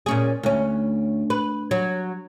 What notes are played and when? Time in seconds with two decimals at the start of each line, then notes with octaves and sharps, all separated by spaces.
0.06 A#2 C#4 G#4
0.43 D2 C#4
1.30 B4
1.71 F#3